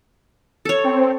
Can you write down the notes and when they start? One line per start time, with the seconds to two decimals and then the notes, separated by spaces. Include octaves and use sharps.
0.65 A4 C#5
0.84 C4